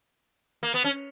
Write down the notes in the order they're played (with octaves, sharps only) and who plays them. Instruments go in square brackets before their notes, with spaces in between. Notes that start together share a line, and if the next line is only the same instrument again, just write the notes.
[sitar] A#3
B3
C#4